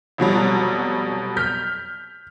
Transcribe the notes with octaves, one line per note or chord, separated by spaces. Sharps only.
F1 B2 F#3 G3
F6 G6 B6